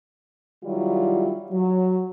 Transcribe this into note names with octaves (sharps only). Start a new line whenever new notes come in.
D#3 F#3 G3 E4 F4
F#3